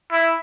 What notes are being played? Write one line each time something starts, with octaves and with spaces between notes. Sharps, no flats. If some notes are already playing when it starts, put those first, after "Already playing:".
E4